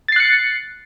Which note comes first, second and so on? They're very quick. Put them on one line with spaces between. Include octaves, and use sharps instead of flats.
A6 C7 F#6 C#7